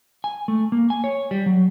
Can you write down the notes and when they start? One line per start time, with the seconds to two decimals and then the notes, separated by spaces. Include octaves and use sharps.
0.24 G#5
0.48 A3
0.72 A#3
0.90 G#5
1.04 C#5
1.31 G3
1.46 F#3